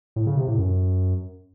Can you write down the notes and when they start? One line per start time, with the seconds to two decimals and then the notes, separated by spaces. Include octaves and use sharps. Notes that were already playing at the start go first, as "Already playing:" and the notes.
0.16 A2
0.27 C#3
0.37 C3
0.48 A2
0.58 F#2